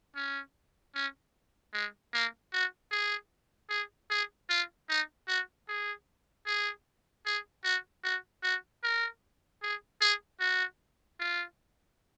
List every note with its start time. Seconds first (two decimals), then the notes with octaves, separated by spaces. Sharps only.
0.16 C#4
0.95 C#4
1.73 G#3
2.13 A#3
2.53 F#4
2.91 G#4
3.70 G#4
4.10 G#4
4.50 F4
4.89 D#4
5.28 F#4
5.68 G#4
6.46 G#4
7.26 G#4
7.64 F#4
8.04 F#4
8.43 F#4
8.84 A#4
9.62 G#4
10.01 G#4
10.40 F#4
11.20 F4